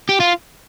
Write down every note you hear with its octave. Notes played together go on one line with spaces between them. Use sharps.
G4
F4